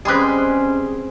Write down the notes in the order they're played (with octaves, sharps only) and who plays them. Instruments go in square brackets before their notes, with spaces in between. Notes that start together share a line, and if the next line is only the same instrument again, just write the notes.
[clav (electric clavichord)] G3 G#3 B4 [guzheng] C4 G#4 [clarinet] C#4